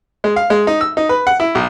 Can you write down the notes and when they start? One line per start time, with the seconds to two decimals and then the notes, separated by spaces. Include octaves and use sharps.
0.24 G#3
0.36 F5
0.50 G#3
0.67 D#4
0.81 E6
0.97 D#4
1.09 B4
1.27 F#5
1.40 E4
1.55 B1